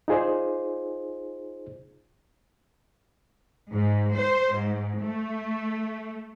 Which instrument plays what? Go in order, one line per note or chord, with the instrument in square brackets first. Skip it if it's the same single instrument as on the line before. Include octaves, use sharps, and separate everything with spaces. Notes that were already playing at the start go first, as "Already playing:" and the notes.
[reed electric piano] D#4 F4 G#4 C5 D5
[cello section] G#2
C5
G#2
A3